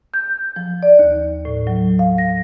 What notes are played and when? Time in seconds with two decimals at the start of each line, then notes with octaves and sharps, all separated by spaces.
0.14 G6
0.56 F3
0.83 D5
0.99 D#2
1.45 A2
1.67 F#3
1.99 F5
2.18 A#6